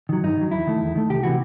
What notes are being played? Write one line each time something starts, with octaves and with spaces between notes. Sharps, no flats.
D#3 F#3
G2 D#4
D#3 F#3
E2 E4
D#3 A3
E2
D#3 A3
C2 G4
C3 E3 F#4